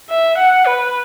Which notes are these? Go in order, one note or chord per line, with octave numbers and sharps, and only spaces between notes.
E5
F#5
B4